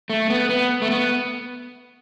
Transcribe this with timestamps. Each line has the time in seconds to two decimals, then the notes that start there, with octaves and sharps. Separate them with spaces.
0.10 A3
0.30 B3
0.49 B3
0.82 A3
0.91 B3